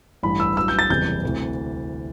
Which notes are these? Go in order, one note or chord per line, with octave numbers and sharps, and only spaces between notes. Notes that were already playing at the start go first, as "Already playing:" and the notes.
A1 G2 E3 G3 B5
E6
A1 G2 F#3 E6
G6
A6
F#1 E2 C3 E3 G3 G6
D2 C3 E3